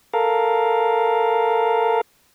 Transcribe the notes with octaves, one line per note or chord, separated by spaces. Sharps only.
A4 A#4 F5